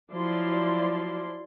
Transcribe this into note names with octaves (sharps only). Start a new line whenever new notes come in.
F3 F#3 E4 D5 C6